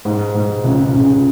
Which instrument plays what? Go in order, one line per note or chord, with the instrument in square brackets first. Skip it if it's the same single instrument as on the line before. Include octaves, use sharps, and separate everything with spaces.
[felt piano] G#2
G#2
C#2 C#3
C#2 C#3